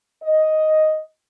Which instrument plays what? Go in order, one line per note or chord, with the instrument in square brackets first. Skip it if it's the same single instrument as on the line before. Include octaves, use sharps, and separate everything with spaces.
[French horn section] D#5